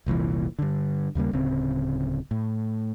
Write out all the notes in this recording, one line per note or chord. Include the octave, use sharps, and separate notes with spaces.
F1 C2 A#2 E3
G2 D3
D#2 C#3 G3 A#3
D1 C#3 C4
A2